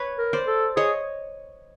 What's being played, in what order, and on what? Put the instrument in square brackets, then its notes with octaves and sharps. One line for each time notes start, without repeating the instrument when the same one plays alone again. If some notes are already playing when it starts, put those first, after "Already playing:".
Already playing: [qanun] B4 C#5
[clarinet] A#4
[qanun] C5 D5
[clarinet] A4
[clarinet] G#4 [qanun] C#5 D#5